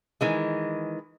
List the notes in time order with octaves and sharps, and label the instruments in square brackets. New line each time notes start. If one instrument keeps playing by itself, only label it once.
[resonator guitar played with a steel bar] D#3 E3 G#3